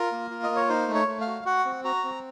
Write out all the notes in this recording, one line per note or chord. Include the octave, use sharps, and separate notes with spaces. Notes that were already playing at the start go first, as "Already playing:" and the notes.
Already playing: F4 A#4
A#3
F4
D#5
A#3
C#5
D#4 C5
A3
C#5
A3
F5
F#4
F#4 F#5
C4
F#4 A#5
C4